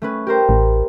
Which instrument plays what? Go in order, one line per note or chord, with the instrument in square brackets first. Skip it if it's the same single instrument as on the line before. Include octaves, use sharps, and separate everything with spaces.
[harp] A3 C#4 B4
G4 A#4 C5
[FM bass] A1